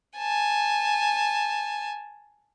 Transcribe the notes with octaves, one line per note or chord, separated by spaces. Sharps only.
G#5 A5